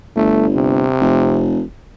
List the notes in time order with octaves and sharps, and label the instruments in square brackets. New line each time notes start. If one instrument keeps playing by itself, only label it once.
[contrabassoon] G1 [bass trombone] A3
[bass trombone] C3
[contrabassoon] F1